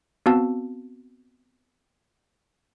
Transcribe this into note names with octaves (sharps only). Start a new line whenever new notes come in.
B3 C4 F#4 F5 A5 E6